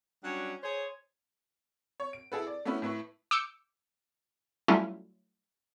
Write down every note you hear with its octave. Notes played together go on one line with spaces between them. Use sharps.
F#3 G3 C#4 D4
G#4 C5 C#5
C#5
D7
E4 G#4 A4 B4
D5
A3 B3 C#4 E4 B4
A2 E4 B4 C#6
D6 E6 G6 C#7
F#3 G3 A3 C#4 E4 F4